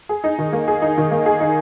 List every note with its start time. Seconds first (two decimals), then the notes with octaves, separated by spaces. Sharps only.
0.09 G#4
0.24 D#4
0.39 D#3
0.53 A#3
0.68 G#4
0.82 D#4
0.98 D#3
1.11 A#3
1.26 G#4
1.40 D#4